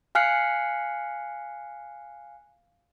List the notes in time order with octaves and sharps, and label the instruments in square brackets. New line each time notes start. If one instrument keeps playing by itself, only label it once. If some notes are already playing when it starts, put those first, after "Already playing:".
[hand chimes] F5 G#5 F6 F#6 C7 C#7